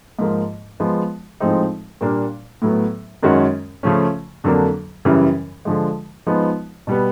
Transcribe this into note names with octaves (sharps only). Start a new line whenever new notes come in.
G#2 F3 A#3
F3 G#3 B3
A2 F3 G#3 C4 D#4
A#2 G3 A#3 D4
A2 F#3 B3
F#2 D#3 G#3 C#4 F#4
C#3 F3 A3 C#4
F2 D3 F#3 A#3 D4
F#2 C#3 E3 G3
D3 F3 G#3
F3 G#3 B3 D#4
B2 G3 B3